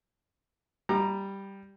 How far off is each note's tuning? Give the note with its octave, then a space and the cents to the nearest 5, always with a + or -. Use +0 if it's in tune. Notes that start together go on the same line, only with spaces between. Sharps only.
G3 +0 A#5 +0 D6 +40